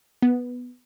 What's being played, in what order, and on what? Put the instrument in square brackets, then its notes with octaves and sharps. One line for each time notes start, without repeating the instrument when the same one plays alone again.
[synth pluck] B3